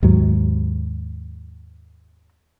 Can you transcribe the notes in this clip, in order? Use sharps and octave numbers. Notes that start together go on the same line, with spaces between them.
D#2 G#2 F#3